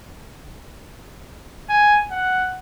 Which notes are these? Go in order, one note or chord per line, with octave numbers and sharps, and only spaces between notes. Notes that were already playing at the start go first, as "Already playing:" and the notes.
G#5
F#5